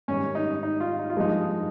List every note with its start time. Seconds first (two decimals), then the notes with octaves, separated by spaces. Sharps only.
0.08 G#2 D#3 G3 C#4
0.35 D#4
0.63 D#4
0.80 F4
0.99 D#4
1.10 F4
1.17 G2 F3 G#3 D#4